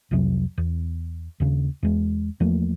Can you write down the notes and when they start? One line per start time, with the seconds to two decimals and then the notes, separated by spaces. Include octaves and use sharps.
0.11 C2 F2 C3 F#3
0.58 E2
1.40 D#2 C#3
1.83 E2 G#3
2.40 E2 F3 A3 A#3